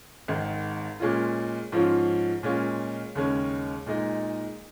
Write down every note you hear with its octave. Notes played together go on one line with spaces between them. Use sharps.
G#1 G#2 D#3
A#2 G#3 C#4 F4
G#2 F3 C#4 F4
A#2 G#3 C#4 F4
D#2 C#3 G#3 C#4
A#2 G#3 D#4